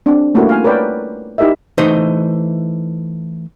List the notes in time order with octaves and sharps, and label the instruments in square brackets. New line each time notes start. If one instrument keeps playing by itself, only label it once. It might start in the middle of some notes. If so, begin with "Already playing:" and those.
[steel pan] C4 D4
G3 A3 A#3 C#4 E4 F#4
F4 F5 G5 G#5
A#4 B4 C#5 D5 F#5 G5
D#4 E4 G4 A#4 D#5 E5
[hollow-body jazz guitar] E3 A3 D#4 C5 D#5